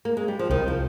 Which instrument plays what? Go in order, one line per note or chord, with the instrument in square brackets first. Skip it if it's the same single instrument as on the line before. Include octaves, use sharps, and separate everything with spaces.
[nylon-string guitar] A#3
G#3
G3
F3
[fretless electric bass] C2 [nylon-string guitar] D#3
[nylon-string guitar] F3